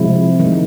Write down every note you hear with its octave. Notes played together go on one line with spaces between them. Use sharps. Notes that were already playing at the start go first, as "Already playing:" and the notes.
Already playing: C3 F3 G#3 E4
D#3 G#3